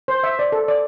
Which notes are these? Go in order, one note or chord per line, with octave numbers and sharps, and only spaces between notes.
C5
E5
D5
A4
D5